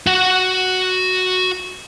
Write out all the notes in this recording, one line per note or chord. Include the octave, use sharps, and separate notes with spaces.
F#4 F#5